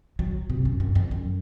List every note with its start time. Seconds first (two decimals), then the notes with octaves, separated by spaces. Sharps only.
0.19 F#3
0.50 C3
0.65 F#2
0.80 F#2
0.95 F2
1.11 F#2